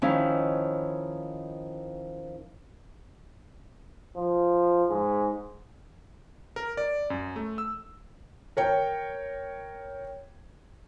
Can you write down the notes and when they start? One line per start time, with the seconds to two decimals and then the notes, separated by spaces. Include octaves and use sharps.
0.02 D#3 F3 C#4 E4
4.16 F3
4.89 G#2
6.56 A#4
6.77 D5
7.10 F#2
7.36 A3
7.58 E6
8.57 A#4 C#5 G5